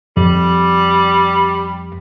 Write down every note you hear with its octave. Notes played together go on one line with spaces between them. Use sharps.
F2 G3